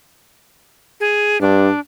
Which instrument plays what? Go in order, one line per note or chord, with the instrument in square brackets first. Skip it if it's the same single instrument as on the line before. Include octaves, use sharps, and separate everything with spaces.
[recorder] G#4
[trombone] G2 [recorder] D4